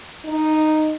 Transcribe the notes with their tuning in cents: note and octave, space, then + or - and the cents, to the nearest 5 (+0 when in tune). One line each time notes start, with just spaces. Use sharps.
D#4 -5